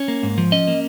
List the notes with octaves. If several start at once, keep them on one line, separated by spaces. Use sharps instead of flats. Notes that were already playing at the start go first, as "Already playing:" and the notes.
Already playing: C#4
A#3
G#2
F3
C#4 D#5
A#3